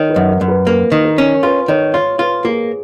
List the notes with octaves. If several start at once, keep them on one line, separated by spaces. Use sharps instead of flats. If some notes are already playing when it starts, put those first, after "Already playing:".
Already playing: D#3 C#5
B4
F#2
A#4
F#2
B4
A#3 B4
D#3
A#4
C#4
F4 B4
D#3 C#5
F4 C#5
F4 B4
A#3 G#4